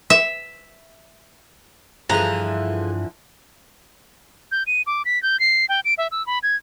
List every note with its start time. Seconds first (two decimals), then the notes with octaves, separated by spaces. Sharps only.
0.10 E5
2.09 G2 D3 E3 F3 F4 G#4 A4 A#5
4.52 G6
4.67 D#7
4.87 D6
5.05 B6
5.23 G6
5.40 C7
5.69 G5
5.85 D7
5.98 E5
6.11 E6
6.27 B5
6.43 G#6